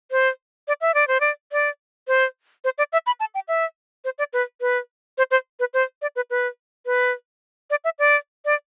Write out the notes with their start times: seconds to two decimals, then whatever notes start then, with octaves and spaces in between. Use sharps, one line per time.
0.11 C5
0.68 D5
0.81 E5
0.94 D5
1.08 C5
1.20 D5
1.52 D5
2.08 C5
2.64 C5
2.78 D5
2.93 E5
3.06 B5
3.20 A5
3.35 G5
3.48 E5
4.05 C5
4.19 D5
4.33 B4
4.61 B4
5.18 C5
5.31 C5
5.60 B4
5.74 C5
6.02 D5
6.16 B4
6.30 B4
6.86 B4
7.70 D5
7.84 E5
7.99 D5
8.45 D5